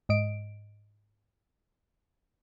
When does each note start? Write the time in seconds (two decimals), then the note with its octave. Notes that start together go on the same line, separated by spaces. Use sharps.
0.09 G#2 D#5 D7